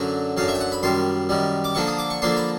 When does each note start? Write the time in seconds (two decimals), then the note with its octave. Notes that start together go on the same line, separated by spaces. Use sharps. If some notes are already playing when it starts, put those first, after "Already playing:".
Already playing: F#2 D3 F#3
0.37 F#2 D3 F#3 F5
0.48 E5
0.55 G5
0.61 F#5
0.72 B5
0.83 F#2 D#3 G3 C6
1.29 F#2 D#3 G3
1.64 D6
1.75 D3 F3 A#3 D4 C#6
1.87 D#6
1.98 D6
2.10 C#6
2.22 D3 F3 A#3 D4 C6
2.37 B5